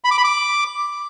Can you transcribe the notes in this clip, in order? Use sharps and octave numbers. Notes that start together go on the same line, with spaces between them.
B5
D6
B5
D6